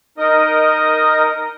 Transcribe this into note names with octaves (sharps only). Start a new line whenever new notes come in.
D#4 A#4 D#5 D#6